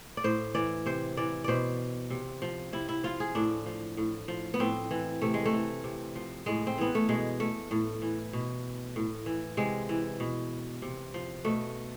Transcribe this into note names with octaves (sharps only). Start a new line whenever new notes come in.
D5
A2 C5
E3 D5
C3 C5
E3 D5
B2 C5 D5
C3
F3
C3 E4
E4
F3 F4
G#4
A2 D4
F3
A2
F3
B3
A2 C4
E3
C3 A3
G#3
A3
E3
C3
F3
A2 G#3
C4
E3 B3
A3
B2 G#3
A3
A2
E3
B2
A2
E3
C3 G#3
E3
B2
C3
F3
B2 A3